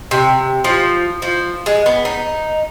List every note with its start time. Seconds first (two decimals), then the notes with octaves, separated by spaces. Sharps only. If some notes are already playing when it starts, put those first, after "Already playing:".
0.11 C3
0.64 F3
1.22 F3
1.66 G#3
1.86 B3
2.05 D#4